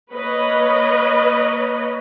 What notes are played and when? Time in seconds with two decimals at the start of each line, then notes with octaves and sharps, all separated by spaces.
0.14 A#3 B4 C#5 D#5